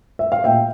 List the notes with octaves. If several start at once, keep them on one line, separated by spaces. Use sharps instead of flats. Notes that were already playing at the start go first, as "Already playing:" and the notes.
E5
F5
A#2 E5 G5